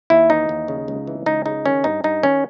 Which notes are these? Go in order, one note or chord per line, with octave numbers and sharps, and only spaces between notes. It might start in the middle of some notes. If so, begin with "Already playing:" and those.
D#2 E4
E3 D#4
D#2
C#3
C#2
E3
C#2 D#4
C#3 D#4
D#3 C#4
G2 D#4
G2 D#4
D#3 C#4